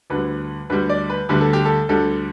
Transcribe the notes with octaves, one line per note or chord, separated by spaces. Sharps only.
D2 D3 G3 B4
D2 D3 G3 B4
D5
B4
D2 D3 G3 B4
A4
G4
A4
D2 D3 G3 A4